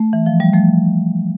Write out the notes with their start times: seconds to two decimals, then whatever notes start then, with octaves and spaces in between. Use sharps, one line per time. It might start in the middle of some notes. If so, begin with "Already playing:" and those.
Already playing: A3
0.13 E3
0.26 F3
0.40 G3
0.54 F3 A3